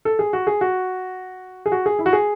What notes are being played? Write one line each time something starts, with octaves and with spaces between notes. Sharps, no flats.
A4
G#4
F#4
G#4
F#4
G#4
F#4
G#4
E4
F#4
G#4